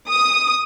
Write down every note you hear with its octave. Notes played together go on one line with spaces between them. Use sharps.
D#6